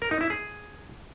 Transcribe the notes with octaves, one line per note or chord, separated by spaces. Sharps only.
A#4
D#4
E4
G#4